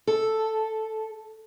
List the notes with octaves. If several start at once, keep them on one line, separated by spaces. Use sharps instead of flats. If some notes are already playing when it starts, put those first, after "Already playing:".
A4